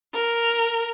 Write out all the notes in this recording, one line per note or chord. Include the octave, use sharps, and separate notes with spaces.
A#4